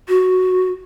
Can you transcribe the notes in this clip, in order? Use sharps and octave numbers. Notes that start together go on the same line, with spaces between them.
F#4